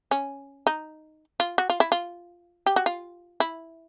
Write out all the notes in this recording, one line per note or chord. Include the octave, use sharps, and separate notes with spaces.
C#4
D#4
F4
F#4
F4
E4
F4
G4
F#4
F4
E4